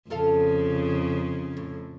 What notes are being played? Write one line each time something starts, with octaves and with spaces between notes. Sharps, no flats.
F2 C#3 F4 A4 F5
A2